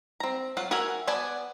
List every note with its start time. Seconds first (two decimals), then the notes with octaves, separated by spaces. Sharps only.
0.20 C4 A#5
0.57 F#3 F4 F5 F#5
0.71 F#4 A#4 E5 F#5 G#5
1.07 B3 D5 F#5 G#5 A5